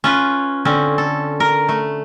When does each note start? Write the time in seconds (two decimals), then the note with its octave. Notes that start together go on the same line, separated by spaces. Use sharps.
0.04 C#4 F4 B4
0.65 D3 C4 C#4
0.98 A4
1.40 A#4
1.69 A3